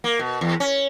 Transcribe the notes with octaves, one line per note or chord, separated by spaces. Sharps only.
A#3
B2
E2
C#4